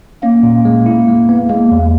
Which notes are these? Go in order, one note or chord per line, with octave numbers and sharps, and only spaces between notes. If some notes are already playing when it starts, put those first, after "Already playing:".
A#3 C#4
A#2
G#3
E4
G#3
B3
G#3 A#3
E2